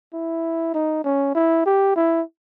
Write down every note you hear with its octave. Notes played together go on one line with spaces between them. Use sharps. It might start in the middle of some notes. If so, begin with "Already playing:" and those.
E4
D#4
C#4
E4
G4
E4